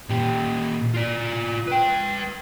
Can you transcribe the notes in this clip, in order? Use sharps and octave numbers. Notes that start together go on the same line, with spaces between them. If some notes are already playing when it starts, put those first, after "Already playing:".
A#2 G4
F4 D5
B4 G5